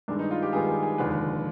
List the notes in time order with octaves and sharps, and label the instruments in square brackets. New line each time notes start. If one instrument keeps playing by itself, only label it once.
[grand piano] G2 D#3 G#3 B3 D4
D#4
F4
G4
G2 D#3 G#3 B3 G#4
G#4
G#4
F1 D#2 D3 F3 G#3 B4